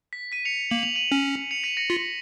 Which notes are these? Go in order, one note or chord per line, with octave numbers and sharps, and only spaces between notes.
B6
B6 D#7
C#7 F7
A#3 F#7
F7
D#7 F#7
C#4
C#7 F7
B6 D#7
A#6 C#7
F4 B6